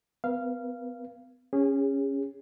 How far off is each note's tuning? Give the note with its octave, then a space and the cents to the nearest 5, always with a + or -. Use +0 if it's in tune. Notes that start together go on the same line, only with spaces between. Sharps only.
B3 +35 B4 -45 F5 -15
C#4 +0 G#4 -35